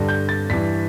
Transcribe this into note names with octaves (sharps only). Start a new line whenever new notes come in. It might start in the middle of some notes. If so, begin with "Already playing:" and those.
Already playing: G2 D3
G6
A6
G2 E3 B6